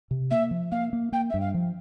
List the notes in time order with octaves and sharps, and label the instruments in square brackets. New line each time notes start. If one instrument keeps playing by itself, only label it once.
[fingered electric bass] C3
[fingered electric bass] A#3 [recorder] E5
[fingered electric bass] F3
[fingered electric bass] A#3 [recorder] F5
[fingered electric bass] A#3
[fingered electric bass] A#3 [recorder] G5
[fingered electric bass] G2 [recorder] E5
[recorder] F5
[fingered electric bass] F3